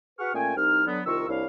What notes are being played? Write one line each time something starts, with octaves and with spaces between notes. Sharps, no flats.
F#4 G#4 B4 F#5 C#6 F6
A#2 A3 C#4 G5 G#5
C2 D#4 F6
D3 F#3 B3
C2 D#3 F4 A#4 C#6 E6
C2 D4 E4 C#5 F5